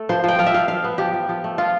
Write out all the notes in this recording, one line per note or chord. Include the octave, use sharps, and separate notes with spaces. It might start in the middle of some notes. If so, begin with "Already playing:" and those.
Already playing: A3 A4
F3 C5
F3 G5
F3 F5
E5
F3 F5
F3 F5
B3
F3 G4
F3
F3
A3
F3 F4